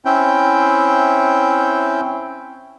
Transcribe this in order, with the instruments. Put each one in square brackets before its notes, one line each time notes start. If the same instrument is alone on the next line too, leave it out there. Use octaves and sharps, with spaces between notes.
[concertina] C4 C#4 E4 G5